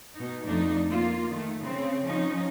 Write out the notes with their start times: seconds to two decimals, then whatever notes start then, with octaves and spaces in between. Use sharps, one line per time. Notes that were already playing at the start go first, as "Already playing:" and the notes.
0.15 B2 D#4
0.46 F2 A3 D4 D#4
0.90 A#3 F4
1.31 D#3 A3
1.62 C#3 C4
2.05 F3 C#4 D#4